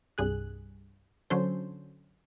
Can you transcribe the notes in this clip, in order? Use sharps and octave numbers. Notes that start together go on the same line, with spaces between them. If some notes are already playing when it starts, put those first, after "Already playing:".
C2 G2 G#4 F#6
D3 F#3 C#4 A4 C5